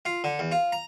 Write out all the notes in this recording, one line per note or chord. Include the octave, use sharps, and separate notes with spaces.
F4
D3
E2
F4
A#5